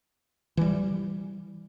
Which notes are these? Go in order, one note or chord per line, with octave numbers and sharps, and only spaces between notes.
E3 G3